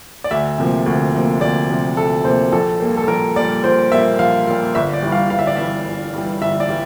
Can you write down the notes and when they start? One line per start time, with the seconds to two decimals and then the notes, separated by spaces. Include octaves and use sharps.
0.24 D5
0.31 D2 E5
0.58 C3 F3 A#3
0.86 D2
1.14 C3 F3 A#3
1.41 D2 D5
1.70 C3 F3 A#3
1.97 D2 A4
2.24 C3 F3 A#3 C5
2.52 A#1 A4
2.80 A#2 G3 A#3
2.97 A4
3.08 A#1 A#4
3.36 A#2 G3 A#3 D5
3.64 A#1 C5
3.92 A#2 G3 A#3 E5
4.19 A#1 F5
4.47 A#2 G3 A#3
4.75 G1 E5
4.93 D5
5.03 G2 E3 G3
5.12 F5
5.30 G1 F5
5.39 E5
5.47 D5
5.57 G2 E3 G3 E5
5.85 G1
6.13 G2 E3 G3
6.42 G1 E5
6.60 D5
6.69 E3 G3